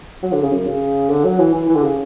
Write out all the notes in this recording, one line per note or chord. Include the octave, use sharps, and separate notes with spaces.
F#3
D3
C#3
F#2
C#3
D3
F#3
E3
E3
E3
D3
C#3